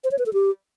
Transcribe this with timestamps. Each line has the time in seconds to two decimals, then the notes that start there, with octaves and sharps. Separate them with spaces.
0.04 C5
0.11 C#5
0.19 B4
0.26 A4
0.33 G4